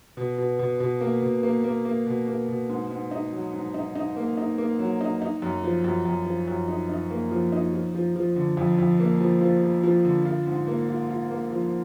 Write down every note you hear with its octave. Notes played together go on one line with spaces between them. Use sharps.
B2
B2
B2
B2
A#3
B2
A#3
A#3
A#3
B2
A#3
B2
G#2
G#2
D#4
F#3
G#2
D#4
D#4
A#3
D#4
A#3
F#3
D#4
D#4
F#2
F3
F#2
F#2
F3
F#2
D#4
D#4
A#3
F3
D#4
F3
F3
F3
D3
F2
F2
A#3
F3
F3
F3
F3
D3
F4
G#2
A#3
F4
F4
A#3
F3